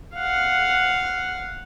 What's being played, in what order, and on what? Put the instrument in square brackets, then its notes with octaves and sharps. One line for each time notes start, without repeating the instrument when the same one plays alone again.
[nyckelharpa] F5 F#5